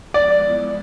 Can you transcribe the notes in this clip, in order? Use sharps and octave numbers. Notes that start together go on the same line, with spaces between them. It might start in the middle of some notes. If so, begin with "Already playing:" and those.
F3 G#3 B3 E4 D5